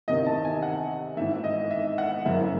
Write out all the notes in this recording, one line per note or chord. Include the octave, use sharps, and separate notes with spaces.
E2 C3 D#3 D#5
A5
G#5
F#5
G#1 G#2 E3 E5
D#5
E5
F#5
F#1 F#2 C#3 E3 E5